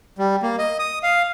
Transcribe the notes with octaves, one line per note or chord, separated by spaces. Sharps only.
G3
A#3
D#5
D#6
F5